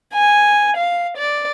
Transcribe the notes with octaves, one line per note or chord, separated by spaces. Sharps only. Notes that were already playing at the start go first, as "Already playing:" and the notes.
G#5
F5
D5